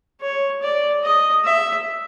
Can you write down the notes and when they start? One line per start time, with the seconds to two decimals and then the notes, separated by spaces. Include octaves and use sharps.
0.21 C#5
0.62 D5
1.03 D#5
1.44 E5